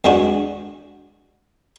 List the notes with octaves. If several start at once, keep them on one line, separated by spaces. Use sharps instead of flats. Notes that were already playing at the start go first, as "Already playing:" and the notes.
E2 G#3 D4 F#4